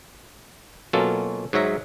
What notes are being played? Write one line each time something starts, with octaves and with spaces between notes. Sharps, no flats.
B2 F#3 A#3 C#4 F4 A4
G#2 F#3 C#5 E5 A#5